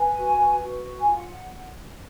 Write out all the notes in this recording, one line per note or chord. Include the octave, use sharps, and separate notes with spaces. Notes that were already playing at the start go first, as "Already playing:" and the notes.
Already playing: B4 G#5
F#4
B4
F#4
B4
G#5
F4
F#5